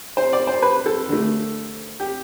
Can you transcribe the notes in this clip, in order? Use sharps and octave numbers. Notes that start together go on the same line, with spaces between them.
C5
D5
C5
B4
A4
D3 A3
G4